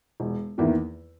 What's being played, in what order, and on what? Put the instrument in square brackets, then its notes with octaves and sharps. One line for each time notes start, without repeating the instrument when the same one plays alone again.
[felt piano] E1
E2 D#3 A#3 E4